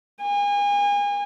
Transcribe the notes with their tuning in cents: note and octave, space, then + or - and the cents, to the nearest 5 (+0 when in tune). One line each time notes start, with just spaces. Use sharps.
G#5 -35